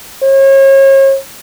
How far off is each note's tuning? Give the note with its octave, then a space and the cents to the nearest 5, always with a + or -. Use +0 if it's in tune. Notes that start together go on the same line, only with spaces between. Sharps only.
C#5 -35